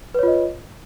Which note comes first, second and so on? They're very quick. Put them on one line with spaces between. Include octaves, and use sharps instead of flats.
B4 C#5 F4 D#5